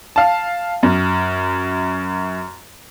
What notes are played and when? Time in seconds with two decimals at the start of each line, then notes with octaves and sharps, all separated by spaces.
0.16 F5 A5
0.83 F#2